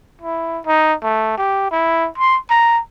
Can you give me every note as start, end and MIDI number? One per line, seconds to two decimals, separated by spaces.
0.22 0.60 64
0.66 0.94 63
1.03 1.33 57
1.37 1.71 67
1.71 2.08 64
2.18 2.38 84
2.50 2.80 82